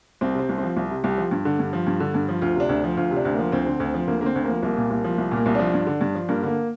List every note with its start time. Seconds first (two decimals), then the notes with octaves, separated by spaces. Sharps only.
0.21 C2 C4
0.35 C3 C4
0.49 C2
0.58 F3 C4
0.77 C2
0.90 C3
1.04 C2 G4
1.18 F3
1.31 G2
1.45 D3
1.59 G2
1.73 F3
1.87 G2
2.00 D3
2.14 G2
2.28 F3
2.42 D2 F4
2.56 C3 D4
2.69 D2
2.84 F3
2.97 D2 F4
3.11 C3
3.16 D4
3.25 D2
3.34 F3 A#3
3.52 D2 C4
3.66 D3
3.80 D2
3.94 F3
4.07 D2 A#3
4.21 D3 A#3 C4
4.35 D2
4.44 F3 A#3
4.63 C2 A#3
4.77 A#2
4.90 C2
5.04 F3
5.18 C2
5.31 A#2 A#3
5.46 C2
5.55 F3 D4
5.74 G2
5.87 D3
6.01 G2
6.15 F3
6.29 G2 A#3
6.42 D3 A#3